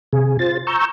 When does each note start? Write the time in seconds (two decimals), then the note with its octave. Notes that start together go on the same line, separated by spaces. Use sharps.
0.13 C3 G#4
0.39 F4 C5 A6
0.67 A#5 C#6 E6 G6